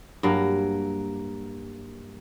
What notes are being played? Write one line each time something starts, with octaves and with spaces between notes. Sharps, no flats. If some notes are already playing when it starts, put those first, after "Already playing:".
G2 F#3 A#3